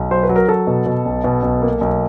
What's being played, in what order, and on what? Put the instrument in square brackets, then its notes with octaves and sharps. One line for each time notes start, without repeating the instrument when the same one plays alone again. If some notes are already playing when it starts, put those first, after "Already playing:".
Already playing: [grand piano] B1
F#3 C5
B4
F#3
A#4
F#3 A4
B2
B2
B1
B2
B1
A#3
B1